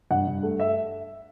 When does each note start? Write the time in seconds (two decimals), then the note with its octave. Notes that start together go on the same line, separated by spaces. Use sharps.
0.11 G2 F#5
0.27 G2
0.43 A3
0.60 E5